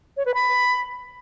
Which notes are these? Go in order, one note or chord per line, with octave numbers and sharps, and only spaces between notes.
C#5
B4
B5